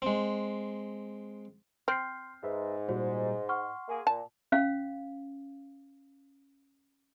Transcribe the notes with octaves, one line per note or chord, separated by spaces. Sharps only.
G#3 C4
C4 C6 F6 G6 C7
G#2 G#4 B4 E5
A#2 G3 F#4 C5
F#5 C6 C#6 F6
A#3 G#4
A#2 A5
C#4 F5